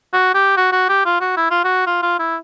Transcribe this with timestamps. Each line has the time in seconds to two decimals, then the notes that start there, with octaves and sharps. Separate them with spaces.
0.13 F#4
0.35 G4
0.57 F#4
0.72 F#4
0.89 G4
1.05 F4
1.21 F#4
1.37 E4
1.51 F4
1.64 F#4
1.86 F4
2.02 F4
2.19 E4